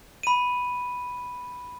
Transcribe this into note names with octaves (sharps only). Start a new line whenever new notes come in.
B5 D#7